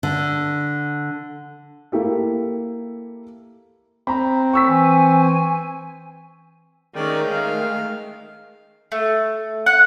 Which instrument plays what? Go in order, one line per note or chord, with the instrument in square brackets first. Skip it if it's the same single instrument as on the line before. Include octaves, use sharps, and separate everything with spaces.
[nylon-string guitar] D3
[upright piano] A#3 E4 G4 A4
[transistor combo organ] C4 [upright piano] A#5 B5
[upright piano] C#6 E6 B6
[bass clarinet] E3 [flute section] G#5
[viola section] D#3 A3 C#4 [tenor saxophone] G#3 [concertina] A#4 G5 [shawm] D5
[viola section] D#3 A3 [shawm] F5
[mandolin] A3
F#5